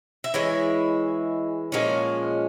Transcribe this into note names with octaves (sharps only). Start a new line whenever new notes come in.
E5
E3 G#3 E4 C#5
A#2 F3 G#3 C#4